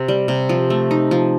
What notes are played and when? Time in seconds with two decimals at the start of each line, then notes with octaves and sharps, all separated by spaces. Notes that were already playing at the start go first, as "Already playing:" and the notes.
Already playing: C3
0.08 G3
0.28 C3
0.49 F3
0.70 A3
0.91 D#4
1.11 F3